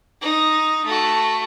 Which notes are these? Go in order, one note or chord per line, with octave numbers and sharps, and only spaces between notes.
D#4
A3 F#4